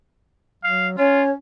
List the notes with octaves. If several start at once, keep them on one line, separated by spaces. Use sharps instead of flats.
F#3 F5
C#4 F4 C#5